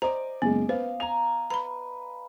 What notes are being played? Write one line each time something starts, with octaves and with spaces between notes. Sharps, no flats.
C5 D5 D#5 G#5 A#5
F#1 G#3 B3
B4 C5 F5
G#5 A#5 F7
B4 A#5 B5